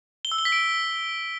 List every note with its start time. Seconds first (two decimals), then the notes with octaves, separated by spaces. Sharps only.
0.25 G7
0.32 E6
0.38 G7
0.45 B6
0.52 D7